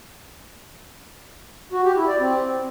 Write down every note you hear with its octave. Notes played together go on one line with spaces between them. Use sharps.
F#4
G4
E4
D5
C4